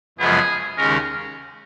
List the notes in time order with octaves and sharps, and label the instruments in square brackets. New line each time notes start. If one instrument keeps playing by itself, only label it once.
[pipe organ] F#2 C#3 F3 G#3 B3 [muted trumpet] G#4
[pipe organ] D#2 C#3 G#3 C#4 [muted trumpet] A#4